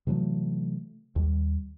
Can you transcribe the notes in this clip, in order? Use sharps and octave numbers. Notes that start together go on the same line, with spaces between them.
C3 E3 F#3 A3
D#2 G3